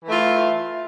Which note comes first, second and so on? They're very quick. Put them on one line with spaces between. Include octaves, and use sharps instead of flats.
E3 A3 F4